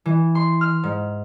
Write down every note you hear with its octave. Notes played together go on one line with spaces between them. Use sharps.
E3
C6
F6
G#2